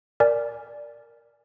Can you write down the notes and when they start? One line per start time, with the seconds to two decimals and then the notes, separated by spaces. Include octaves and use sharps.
0.20 A#4 D5 G#5